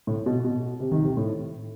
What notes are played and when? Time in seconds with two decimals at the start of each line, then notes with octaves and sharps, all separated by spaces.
0.07 A2
0.26 B2
0.44 B2
0.80 C3
0.92 D#3
1.02 C3
1.17 A2